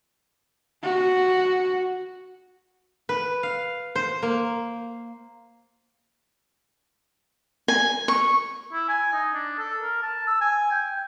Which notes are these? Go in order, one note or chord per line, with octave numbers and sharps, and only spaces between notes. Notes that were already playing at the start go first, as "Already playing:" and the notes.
F#4
B4
F5
C5
A#3
G#5
C#6
E4
G#5
D#4
D4
A4
A#4
A5
E6
G#5
G5
G5